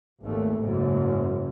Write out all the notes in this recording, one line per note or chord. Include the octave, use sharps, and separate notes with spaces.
G#1 D#2 A3
F#1 G#2